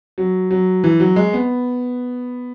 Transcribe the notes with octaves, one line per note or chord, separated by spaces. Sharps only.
F#3
F#3
E3
F#3
G#3
B3